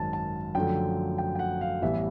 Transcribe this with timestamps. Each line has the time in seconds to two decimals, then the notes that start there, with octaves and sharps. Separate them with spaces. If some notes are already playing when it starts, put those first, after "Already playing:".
Already playing: G#1 F#2 D#3 A5
0.13 A5
0.55 F#2 D3 F3 A3 G5
1.18 G5
1.35 G5
1.39 F#5
1.61 F5
1.82 A1 A2 E3 G3 B3 E5